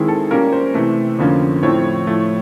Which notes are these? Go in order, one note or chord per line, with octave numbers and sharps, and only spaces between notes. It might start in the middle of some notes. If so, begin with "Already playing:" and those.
Already playing: D#3 G#3 C4 E4 G#4
A4
A#2 G3 A#3 C#4 A#4
C5
C3 E3 A3
F2 D3 F3 A#3 C#4
A2 F3 A3 C4 C#5
A2 F3 A3